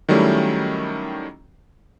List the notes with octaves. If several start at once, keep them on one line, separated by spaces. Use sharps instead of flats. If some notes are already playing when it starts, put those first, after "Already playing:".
D#3 F#3 G3 A3 C#4 E4